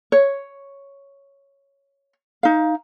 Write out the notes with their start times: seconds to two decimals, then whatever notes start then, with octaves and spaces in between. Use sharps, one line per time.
0.12 C#5
2.43 D#4 F5